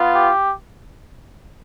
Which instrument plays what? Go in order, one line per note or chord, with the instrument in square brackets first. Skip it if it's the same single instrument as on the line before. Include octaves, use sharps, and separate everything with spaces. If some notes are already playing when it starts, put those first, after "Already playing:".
Already playing: [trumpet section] B3 F4
G4